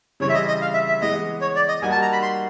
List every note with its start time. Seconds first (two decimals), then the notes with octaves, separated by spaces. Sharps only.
0.20 C#3 E3 G3 C4 C#5
0.30 E5
0.34 D#5
0.48 D#5
0.61 F5
0.74 E5
0.88 E5
1.01 E3 G#3 B3 D#5
1.41 C#5
1.56 D5
1.68 D#5
1.82 G3 A#3 D#4 F#4 G#5
1.92 A5
2.02 A#5
2.12 B5
2.22 C6